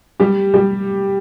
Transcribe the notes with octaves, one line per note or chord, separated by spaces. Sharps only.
G3 G4
G3 G4